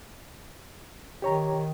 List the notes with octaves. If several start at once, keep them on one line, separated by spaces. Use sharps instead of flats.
D#3 G4 C#5 A#5